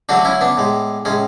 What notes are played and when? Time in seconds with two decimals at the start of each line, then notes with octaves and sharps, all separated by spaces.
0.09 D3 F#3 A3 D4 F#4
0.25 C#4 E4
0.41 B3 D4
0.57 A2 G#3
1.05 A2 G#3 C#4